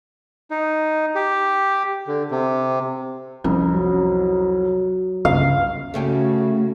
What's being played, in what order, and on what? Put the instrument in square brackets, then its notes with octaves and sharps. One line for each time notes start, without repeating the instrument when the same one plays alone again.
[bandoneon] D#4
G4
D3
C3
[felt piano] C2 F2 [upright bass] C#4
[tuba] F#3
[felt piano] G1 [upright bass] C#2 [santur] F5
[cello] C#3 F#4 [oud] A3 C#4 G4